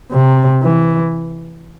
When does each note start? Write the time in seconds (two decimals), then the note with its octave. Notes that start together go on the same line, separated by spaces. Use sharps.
0.12 C3
0.63 E3